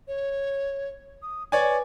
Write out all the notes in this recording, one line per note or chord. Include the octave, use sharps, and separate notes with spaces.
C#5
D#6
B4 C#5 D5 G#5